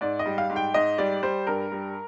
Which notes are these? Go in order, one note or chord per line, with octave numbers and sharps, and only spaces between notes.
G#2 D5
D#5
G3
F5
G#2
G5
G#2 D#5
G3 D5
G3 C5
G2 A#4
G3